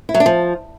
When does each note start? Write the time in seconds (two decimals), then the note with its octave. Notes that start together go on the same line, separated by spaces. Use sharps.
0.09 E4
0.14 F#3
0.20 D4
0.26 F3